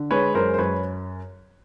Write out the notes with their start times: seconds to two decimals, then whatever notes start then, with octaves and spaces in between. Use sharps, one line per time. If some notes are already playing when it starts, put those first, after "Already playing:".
Already playing: D3
0.11 G#3 B4 C#5
0.34 F#2 A#4 C5
0.54 C5
0.58 F#2 B4 C#5